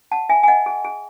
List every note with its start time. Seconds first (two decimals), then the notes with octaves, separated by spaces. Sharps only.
0.12 F#5 A5
0.29 E5 G#5
0.43 G#5
0.48 D#5 F#5
0.66 G#4
0.84 G#4